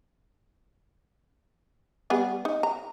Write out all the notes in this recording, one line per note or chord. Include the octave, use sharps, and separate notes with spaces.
G3 B3 G#4
D#4
A#5